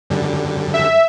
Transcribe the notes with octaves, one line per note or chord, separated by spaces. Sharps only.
F#2 D3 G3
E5